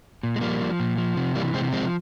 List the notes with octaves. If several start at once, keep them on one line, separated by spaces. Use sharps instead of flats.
A#2
G#3
F3 G3 A#3
F3
A#2
F3
C3
E3 G3 A#3
C3 G#3 C4
F3 G#3 C4